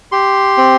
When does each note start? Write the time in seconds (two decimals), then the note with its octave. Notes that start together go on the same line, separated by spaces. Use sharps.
0.12 G4 C6
0.58 C4